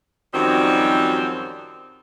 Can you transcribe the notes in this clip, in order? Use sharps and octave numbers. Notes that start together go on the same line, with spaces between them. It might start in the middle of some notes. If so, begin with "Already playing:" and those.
F#2 D#3 F3 G3 C4 F#4